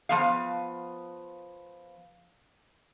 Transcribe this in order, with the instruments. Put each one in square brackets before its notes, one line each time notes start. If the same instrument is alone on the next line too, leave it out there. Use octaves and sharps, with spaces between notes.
[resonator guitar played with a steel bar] F3 B3 F5